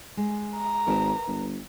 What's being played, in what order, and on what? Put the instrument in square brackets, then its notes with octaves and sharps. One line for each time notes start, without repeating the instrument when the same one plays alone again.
[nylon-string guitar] G#3
[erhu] A#5
[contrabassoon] G#1 [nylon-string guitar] A#4 B4 A5
[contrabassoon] G1